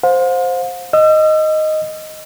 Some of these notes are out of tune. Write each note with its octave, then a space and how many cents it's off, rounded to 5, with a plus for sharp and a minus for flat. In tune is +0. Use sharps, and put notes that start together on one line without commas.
C5 +0 F5 +40
D#5 +0 E6 +40